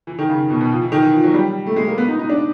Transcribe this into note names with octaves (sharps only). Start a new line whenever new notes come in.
E3
D#3
C#3
B2
B2
F3
E3
D#3
E3
F3
F#3
G3
A3
G#3
A#3
B3
D#4
D#4
D4